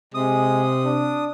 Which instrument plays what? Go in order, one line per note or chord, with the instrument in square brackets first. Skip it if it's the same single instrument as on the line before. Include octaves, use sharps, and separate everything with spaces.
[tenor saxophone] C3 [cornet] G#3 [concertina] D#6
[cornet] D4